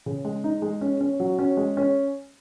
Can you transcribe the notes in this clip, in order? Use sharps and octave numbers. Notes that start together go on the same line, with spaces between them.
C#3
G#3
D#4
G#3
C#4
C#4
F#3
C#4
G#3
C#4